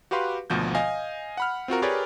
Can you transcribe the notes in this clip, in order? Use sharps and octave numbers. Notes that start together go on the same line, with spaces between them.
F#4 G4 B4 F5 C6 D6
G#1 D2 B2 F3 G6
D#5 F5 G#5
F#5 B5 F6
C4 F4 F#4 A#4
G4 G#4 A#4 B4 C#5 D5